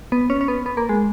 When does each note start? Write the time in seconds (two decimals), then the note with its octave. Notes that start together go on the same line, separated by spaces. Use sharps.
0.12 B3
0.30 C#4
0.41 C#4
0.48 B3
0.66 B3
0.77 A#3
0.89 G#3